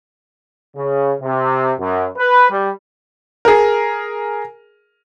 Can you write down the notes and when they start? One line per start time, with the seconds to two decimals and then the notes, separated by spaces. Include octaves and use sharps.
0.75 C#3
1.20 C3
1.79 F#2
2.16 B4
2.49 G3
3.45 G#4 A#4